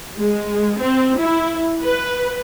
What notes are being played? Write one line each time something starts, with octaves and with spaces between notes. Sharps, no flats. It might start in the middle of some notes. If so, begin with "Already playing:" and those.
G#3
C4
E4
B4